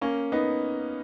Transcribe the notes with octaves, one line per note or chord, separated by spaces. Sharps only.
A#3 C#4
B3 D#4